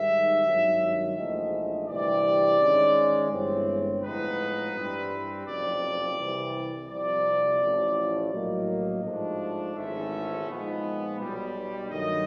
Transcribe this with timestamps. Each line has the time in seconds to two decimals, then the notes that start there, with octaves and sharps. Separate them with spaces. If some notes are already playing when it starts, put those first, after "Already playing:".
Already playing: G#2 D#3 G3 E5
0.44 G#1 G2 D#3 F#3
1.16 A#1 G#2 E3 A3 D#5
1.88 D2 C3 E3 G3 D5
2.60 G#2 D#3 G#3 C#4
3.31 G1 G2 E3 G#3 C4 C#5
4.03 A2 F3 G#3 B3 D#4 B4
4.75 G2 E3 G3 C4
5.46 F#1 F2 C3 D5
6.18 C2 C3 E3
6.89 C2 C3 F3 D5
7.61 A1 A2 F3
8.33 A#1 A2 F#3 A#3 D#5
9.04 G#2 F3 A3 D4
9.76 G#1 G#2 E3 A3 C#4 E5
10.48 A#2 F3 G#3 B3 D#4
11.20 B1 B2 G3
11.90 G2 D#3 F#3 A3 D#5